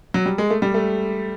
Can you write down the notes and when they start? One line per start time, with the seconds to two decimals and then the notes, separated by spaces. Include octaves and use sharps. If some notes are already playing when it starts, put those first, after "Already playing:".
0.14 F#3
0.26 G3
0.38 G#3
0.50 A3
0.62 G3
0.74 A3